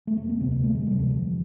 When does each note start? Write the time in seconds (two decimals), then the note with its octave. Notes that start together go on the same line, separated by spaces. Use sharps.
0.07 A3
0.17 E1 A#3
0.29 C4
0.40 D2 C3 B3
0.52 A#3
0.64 E1 A3
0.75 G#3
0.87 D2 C3 G3
0.99 F3
1.10 E1